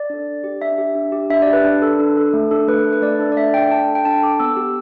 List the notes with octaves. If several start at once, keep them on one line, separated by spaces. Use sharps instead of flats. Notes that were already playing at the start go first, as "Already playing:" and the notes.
Already playing: D5
D4 A4
D4
G4
D4 E5
G4
D4
G4
D4 E5
D5
G4
B4
D4
A4
D4
A4
A3
D4 A4
A3 B4
D4 A4
B4
A3 D5
D4 A4
D5
A3 E5
D4 A4 G5
D4 A5
A4
G5
D4 A5
A4 D6
B3 E6
G4